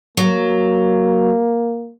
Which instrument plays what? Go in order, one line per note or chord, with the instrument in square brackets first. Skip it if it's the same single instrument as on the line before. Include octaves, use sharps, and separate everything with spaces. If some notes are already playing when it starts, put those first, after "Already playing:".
[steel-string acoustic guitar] F#3 [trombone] A#3